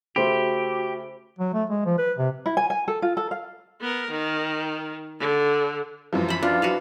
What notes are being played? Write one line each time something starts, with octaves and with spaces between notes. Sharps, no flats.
C#3 A3 F#4 G4 C5 B5
F#3
A3
G#3
F3
B4
C3
E4
G#5
G#5
A4
F4
A4
F5
B3 A#4
D#3
D3
F#2 E3 F3
C5 B5
D4 F4
F#4 B4 F5